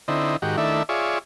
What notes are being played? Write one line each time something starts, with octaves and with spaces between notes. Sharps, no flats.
D3 C4 D#4 E4
G#2 D#3 F#4 G4
D#3 A3 D4 E4 E5
F4 G#4 C#5 D5 E5